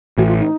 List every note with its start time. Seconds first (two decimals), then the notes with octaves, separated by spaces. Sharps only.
0.17 A1 A2 E3 F#4
0.28 F4
0.39 D#4